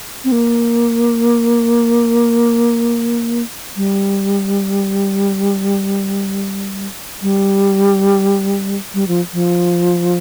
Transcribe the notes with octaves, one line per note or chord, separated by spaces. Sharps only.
C4
A#3
G3
G3
G3
F3
F3